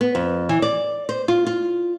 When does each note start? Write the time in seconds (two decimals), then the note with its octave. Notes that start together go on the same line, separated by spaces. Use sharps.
0.01 B3
0.15 F2
0.49 E3
0.62 D5
1.09 C5
1.28 F4
1.47 F4